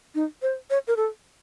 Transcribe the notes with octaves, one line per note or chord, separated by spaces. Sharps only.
D#4
C5
C#5
A#4
A4